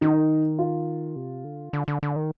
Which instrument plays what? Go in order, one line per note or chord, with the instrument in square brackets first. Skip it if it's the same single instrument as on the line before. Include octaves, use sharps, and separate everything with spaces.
[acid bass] D#3 [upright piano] D#4
[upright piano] F4
[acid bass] C3
D3
D3
D3
D3
D#3